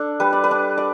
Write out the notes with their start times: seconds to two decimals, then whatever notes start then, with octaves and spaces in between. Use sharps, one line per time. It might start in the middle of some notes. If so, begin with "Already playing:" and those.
Already playing: D4 A4
0.20 G3 B4
0.33 D5
0.44 B4
0.51 D4
0.77 D5